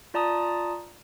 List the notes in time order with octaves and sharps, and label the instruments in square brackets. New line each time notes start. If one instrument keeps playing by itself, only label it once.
[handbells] F4 D5 A5 A#5 D#6